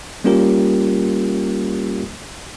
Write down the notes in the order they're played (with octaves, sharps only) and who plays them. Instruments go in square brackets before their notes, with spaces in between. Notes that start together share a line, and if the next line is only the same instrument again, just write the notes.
[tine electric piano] G3 A#3 C#4 F4 G4 A#4